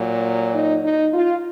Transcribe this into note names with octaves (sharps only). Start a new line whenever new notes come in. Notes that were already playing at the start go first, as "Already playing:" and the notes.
Already playing: A#2 F#3
D#4
D#4
F4